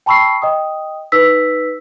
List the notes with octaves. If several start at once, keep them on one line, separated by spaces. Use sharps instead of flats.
G5 A5 B5 C#6 E6 C7
D#5 G5 D#6
D#4 B4 E6 B6